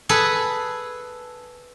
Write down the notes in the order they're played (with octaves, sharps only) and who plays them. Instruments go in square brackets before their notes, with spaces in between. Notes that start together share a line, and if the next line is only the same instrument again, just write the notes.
[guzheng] G#4 A4 B4